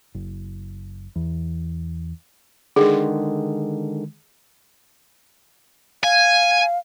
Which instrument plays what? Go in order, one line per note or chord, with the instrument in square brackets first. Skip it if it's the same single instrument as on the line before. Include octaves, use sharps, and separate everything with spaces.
[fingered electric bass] F#1
E2
[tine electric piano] D3 D#3 G#3 [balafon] G#4
[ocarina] F5 [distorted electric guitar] G#5